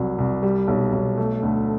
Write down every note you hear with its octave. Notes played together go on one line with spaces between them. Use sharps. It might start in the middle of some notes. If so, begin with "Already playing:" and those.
Already playing: C2 F#3
C2
G3
B1
B1
A3
D2